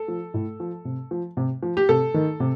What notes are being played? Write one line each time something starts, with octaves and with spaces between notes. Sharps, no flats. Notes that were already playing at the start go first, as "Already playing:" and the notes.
Already playing: A4
F3
A2
F3
C3
F3
C3
F3
G4
C3 A4
D#3
C3